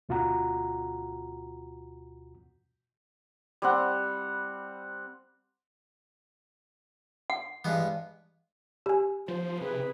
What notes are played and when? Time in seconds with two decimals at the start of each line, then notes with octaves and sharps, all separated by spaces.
0.09 D2 B2 F4 F#4 F#5 A#5
3.62 G3 C4 F#5
7.30 F#5
7.65 G2 E3 G#3 B3
8.86 G4 G#5
9.28 F3 C5
9.61 C3 G#4 B4